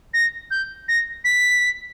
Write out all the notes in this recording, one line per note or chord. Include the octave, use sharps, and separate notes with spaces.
A#6
G6
A#6
B6